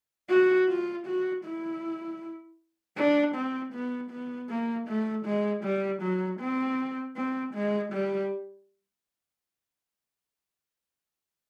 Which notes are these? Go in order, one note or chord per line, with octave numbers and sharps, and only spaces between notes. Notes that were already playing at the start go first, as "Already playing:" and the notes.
F#4
F4
F#4
E4
D4
C4
B3
B3
A#3
A3
G#3
G3
F#3
C4
C4
G#3
G3